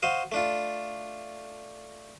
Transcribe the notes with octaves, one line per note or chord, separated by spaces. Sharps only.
F#4 C5 D#5 F5
A3 D4 F4